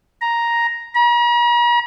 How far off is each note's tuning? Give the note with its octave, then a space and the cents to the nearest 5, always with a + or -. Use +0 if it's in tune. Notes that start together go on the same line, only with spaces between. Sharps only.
A#5 +5
A#5 +45